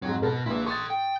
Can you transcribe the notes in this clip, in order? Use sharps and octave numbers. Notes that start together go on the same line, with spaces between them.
F2 G#2 F#3
B2 A#4 A5
A#1 A#2 E4 B4
A4 C6 C#6 D#6 A6
G5